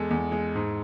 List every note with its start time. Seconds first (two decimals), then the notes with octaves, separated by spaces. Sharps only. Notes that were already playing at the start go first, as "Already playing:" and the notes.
Already playing: E2 G#3 A4
0.11 E2
0.32 G#3
0.55 G#2